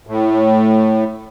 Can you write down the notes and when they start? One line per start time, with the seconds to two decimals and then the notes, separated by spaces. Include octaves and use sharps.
0.07 A2